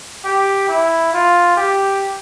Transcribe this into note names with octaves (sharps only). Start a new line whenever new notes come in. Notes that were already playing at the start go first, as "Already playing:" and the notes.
G4
E4
F4
G4